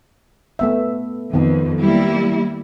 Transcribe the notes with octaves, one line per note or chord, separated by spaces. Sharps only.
A3 B3 E5
F2 D#3 B3
G3 A#3 E4